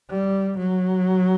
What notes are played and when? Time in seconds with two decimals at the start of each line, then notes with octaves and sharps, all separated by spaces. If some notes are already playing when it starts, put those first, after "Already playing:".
0.10 G3
0.58 F#3